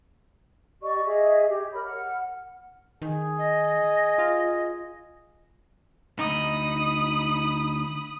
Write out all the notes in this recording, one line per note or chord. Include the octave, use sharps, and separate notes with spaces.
G4 D5 D#5 C#6
G#4 D#5 E5
G4
A#4 C#5 B5
F#5 F6
D#3 G#4
D#5
F4
D2 D#4 B5 D#6